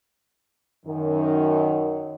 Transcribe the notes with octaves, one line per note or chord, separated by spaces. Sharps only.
F#2 D#3